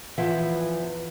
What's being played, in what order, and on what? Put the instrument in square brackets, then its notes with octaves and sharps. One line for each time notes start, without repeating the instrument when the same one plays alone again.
[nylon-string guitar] E2 E3 F3 E5 F#5